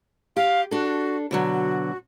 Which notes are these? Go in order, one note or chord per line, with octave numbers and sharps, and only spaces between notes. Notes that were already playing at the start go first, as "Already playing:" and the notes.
G4 F5
D4 F#4 A4
B2 D3 F#3 F#4